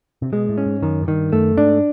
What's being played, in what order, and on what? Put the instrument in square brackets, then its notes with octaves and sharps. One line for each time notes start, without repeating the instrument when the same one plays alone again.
[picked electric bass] C3
[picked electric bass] B2 [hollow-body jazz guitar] G#3
[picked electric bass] A2
[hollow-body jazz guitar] C#4
[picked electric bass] G#2
[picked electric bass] F#2 [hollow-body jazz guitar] D#3
[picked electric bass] G#2
[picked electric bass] G2 [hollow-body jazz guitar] D#3
[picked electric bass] F#2 [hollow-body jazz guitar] A3
[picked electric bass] G#2 [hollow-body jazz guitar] D4